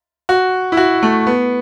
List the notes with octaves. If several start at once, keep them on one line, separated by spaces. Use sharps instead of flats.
F#4
E4
F#4
A3
B3